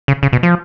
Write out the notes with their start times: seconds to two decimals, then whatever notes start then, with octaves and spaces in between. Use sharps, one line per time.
0.08 C#3
0.23 C#3
0.33 B2
0.43 F3